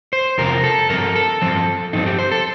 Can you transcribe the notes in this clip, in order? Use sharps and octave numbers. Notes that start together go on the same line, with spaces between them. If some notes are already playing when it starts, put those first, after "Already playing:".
C5
F2 C3 F3 C4 A#4
A4
G2 F3 C4 A#4
A4
G2 F3 C4
G2 F3 C4 D#4
G4
C5
A4